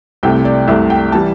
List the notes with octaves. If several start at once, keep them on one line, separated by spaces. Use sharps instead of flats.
C2 C3 A3 G5
D5
C2 C3 A3 E5
G5
E3 G3 A5